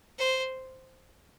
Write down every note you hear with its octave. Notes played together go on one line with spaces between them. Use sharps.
C5